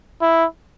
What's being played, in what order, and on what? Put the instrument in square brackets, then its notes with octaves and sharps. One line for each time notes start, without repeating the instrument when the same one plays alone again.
[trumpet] E4